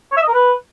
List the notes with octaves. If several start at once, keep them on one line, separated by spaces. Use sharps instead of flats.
C#5
E5
D#5
A#4
B4